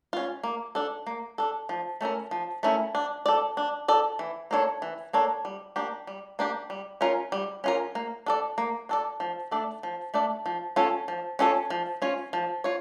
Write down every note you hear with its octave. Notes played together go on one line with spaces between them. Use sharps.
C#4 F4
A#3
D4 A4
A#3
D4 A4
F3
A3 C#4 E4 A#4
F3
A3 C#4 E4 A#4
D4
A4 D5
D4
A4 D5
E3
A#3 D4 A4 C#5
E3
A#3 D4 A4 C#5
G3
A#3 D4 G4
G3
A#3 D4 G4
G3
C#4 F4 A#4
G3
C#4 F4 A#4
A#3
D4 A4 D5
A#3
D4 A4 D5
F3
A3 D4 A4 D5
F3
A3 D4 A4 D5
F3
C#4 F4 A4 C#5
F3
C#4 F4 A4 C#5
F3
C#4 F4 C#5
F3
F4 C#5